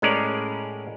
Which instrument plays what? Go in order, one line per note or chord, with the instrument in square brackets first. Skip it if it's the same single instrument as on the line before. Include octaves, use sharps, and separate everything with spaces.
[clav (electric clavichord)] A2 G#3 C#4 G#4 A#4 D5